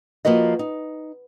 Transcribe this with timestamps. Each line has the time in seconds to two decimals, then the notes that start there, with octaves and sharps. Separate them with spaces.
0.25 F3 A#3 F#4 B4 D#5
0.59 D#4